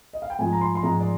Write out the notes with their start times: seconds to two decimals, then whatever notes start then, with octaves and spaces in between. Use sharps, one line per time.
0.13 D#5
0.22 F5
0.30 G5
0.39 G#2 F3 G#3 G#5
0.53 A#5
0.61 C6
0.75 C6
0.83 G#2 F3 G#3 A#5
1.01 D5